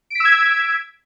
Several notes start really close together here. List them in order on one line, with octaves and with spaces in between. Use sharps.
D7 B6 E6 G#6